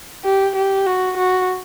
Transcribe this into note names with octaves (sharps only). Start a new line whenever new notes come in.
G4
G4
F#4
F#4